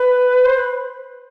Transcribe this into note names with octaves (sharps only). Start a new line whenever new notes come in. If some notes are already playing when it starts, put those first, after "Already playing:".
Already playing: B4
C5
B4